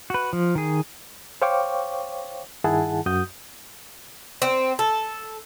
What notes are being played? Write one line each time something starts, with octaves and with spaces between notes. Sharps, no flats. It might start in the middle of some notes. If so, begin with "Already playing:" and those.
F#4 B4
F3
D#3 G#4
C5 C#5 F5 G5 C#6 D6
G2 D#3 E4 G#4 F#5 A5
F#2 F#4 D#6 G6
C4
A4